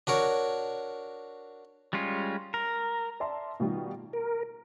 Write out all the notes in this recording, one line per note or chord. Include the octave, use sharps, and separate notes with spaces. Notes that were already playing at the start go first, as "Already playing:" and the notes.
D4 F#4 A#4 C#5
G3 G#3 C#4 F4
A#4
D5 E5 A5 C6
B2 D#3 G3 F4
A#4